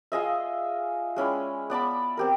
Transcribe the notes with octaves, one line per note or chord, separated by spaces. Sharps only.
F4 G#4 D#5 E5
G#3 C#4 E4 D5
B3 D5 A5 B5
C4 G4 A#4